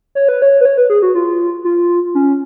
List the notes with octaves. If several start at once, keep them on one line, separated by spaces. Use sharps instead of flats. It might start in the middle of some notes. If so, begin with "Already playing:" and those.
C#5
B4
C#5
B4
C#5
B4
G#4
F#4
F4
F4
C#4